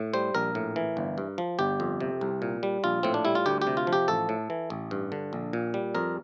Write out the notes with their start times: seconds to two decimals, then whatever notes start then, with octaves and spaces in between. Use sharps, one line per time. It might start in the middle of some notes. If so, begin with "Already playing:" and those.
Already playing: A2
0.14 G3 C5
0.35 A#1 A#4
0.55 A2
0.76 E3
0.97 G1
1.18 G2
1.38 F3
1.59 G1 G4
1.80 F2
2.00 C3
2.21 C2
2.42 A#2
2.63 G3
2.84 A#1 F4
3.03 A2 C4
3.14 D4
3.25 G3 E4
3.35 F4
3.46 D2 G4
3.62 G4
3.67 C3
3.77 F4
3.87 F3
3.93 G4
4.08 A1 A4
4.29 A2
4.50 E3
4.70 A1
4.91 G2
5.12 D3
5.33 A#1
5.53 A#2
5.74 G3
5.95 F2 A#4